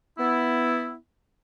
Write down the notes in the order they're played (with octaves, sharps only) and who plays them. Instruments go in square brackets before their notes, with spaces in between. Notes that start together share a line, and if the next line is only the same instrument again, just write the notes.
[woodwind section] B3 E4